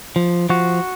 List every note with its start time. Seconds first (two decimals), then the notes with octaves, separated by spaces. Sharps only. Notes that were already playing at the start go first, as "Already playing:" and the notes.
0.16 F3
0.49 F3 F#4